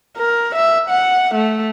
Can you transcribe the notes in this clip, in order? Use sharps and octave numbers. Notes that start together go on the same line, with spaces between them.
A#4
E5
F#5
A3